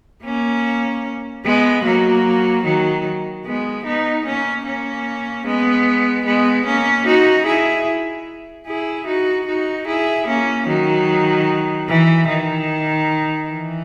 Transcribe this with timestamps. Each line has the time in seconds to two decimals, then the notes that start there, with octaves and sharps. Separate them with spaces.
0.23 A#3 C#4
1.45 G#3 B3
1.84 F#3 A#3
2.64 D#3 F#3
3.45 G#3 B3
3.85 B3 D#4
4.25 A#3 C#4
4.65 A#3 C#4
5.46 G#3 B3
6.26 G#3 B3
6.66 A#3 C#4
7.07 D#4 F#4
7.46 E4 G#4
8.67 E4 G#4
9.07 D#4 F#4
9.47 D#4 F#4
9.87 E4 G#4
10.27 A#3 C#4
10.67 D#3 F#3
11.88 E3
12.28 D#3
13.48 E3